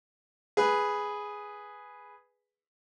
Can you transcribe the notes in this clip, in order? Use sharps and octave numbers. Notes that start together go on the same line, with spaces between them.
G#4 B4